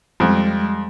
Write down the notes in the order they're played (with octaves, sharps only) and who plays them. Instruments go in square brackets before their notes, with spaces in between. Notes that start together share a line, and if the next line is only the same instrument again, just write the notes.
[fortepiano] F2 [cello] G3 G#3